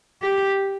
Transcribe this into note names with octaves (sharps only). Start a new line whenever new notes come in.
G4